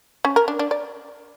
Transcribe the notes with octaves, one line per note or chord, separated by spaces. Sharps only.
C#4
A#4
D4
D4
D5